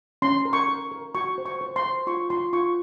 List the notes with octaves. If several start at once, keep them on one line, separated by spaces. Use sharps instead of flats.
C#4 C6
A#4
C#6
A#4
A#4
F#4 C#6
C5
C#6
C5
C6
C5
F4 C#6
F4 C6
F4 C#6